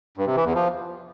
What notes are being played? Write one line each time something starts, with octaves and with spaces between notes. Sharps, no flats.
G2
C3
E3
E2
F3